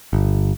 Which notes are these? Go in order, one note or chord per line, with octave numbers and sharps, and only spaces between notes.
G1